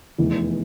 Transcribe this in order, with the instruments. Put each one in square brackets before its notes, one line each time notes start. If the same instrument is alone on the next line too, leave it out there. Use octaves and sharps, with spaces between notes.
[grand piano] F1 E2 E3